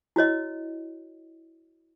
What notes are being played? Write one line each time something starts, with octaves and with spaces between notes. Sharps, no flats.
E4 F#4 C#5 D#5